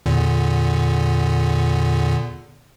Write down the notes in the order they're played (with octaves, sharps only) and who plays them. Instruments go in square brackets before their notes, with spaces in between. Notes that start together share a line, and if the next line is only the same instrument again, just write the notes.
[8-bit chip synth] E2 A#2 D3